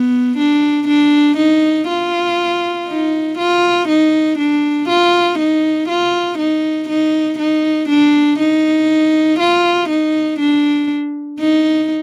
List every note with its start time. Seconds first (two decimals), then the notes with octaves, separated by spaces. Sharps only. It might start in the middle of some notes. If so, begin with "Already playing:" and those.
Already playing: B3
0.37 D4
0.87 D4
1.37 D#4
1.88 F4
2.88 D#4
3.38 F4
3.88 D#4
4.38 D4
4.88 F4
5.39 D#4
5.88 F4
6.38 D#4
6.89 D#4
7.39 D#4
7.88 D4
8.39 D#4
9.39 F4
9.89 D#4
10.39 D4
11.39 D#4